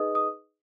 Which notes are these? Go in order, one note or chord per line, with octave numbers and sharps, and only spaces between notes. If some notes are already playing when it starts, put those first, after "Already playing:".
Already playing: D#4 G#4 B4 D#5 D#6
D#6